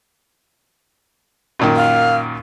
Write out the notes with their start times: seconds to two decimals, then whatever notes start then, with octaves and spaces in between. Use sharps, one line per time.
1.59 F#2 A#2 D#3
1.76 F5